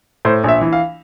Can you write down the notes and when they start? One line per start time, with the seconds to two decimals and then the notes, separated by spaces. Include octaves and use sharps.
0.25 A2 C5
0.44 A#1 E5
0.61 E3
0.73 F5